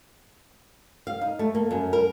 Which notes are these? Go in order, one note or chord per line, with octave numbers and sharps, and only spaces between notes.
F5
D#4
A3
A#3
F#2
A#4